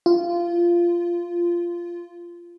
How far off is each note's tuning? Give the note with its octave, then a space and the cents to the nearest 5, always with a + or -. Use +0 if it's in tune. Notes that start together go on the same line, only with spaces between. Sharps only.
F4 -15